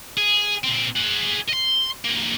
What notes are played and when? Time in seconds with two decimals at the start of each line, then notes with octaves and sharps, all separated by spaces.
0.17 G#4
0.64 A#2 C4
0.96 G#4 F#5
1.49 D#5 C6
2.05 G2 A#3